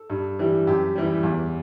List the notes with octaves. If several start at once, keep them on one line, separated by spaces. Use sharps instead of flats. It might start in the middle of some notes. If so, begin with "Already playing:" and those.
Already playing: A4
G2
E3 G3
F#2 G4
E3 G3
E2